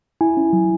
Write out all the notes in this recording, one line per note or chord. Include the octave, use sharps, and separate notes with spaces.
E4 G#5
C#4
F#3